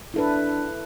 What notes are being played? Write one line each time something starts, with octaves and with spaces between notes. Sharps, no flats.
D4 E4 A4 B4